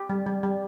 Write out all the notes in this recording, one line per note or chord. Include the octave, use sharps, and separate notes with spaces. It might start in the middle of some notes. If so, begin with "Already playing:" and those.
Already playing: G4
G3
G3
G3